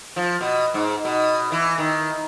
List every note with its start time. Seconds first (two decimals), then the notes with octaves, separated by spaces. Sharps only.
0.16 F3
0.41 B2
0.74 G#2
1.05 B2
1.52 E3
1.78 D#3